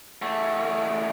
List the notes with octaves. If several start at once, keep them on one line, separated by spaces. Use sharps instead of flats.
E2 A3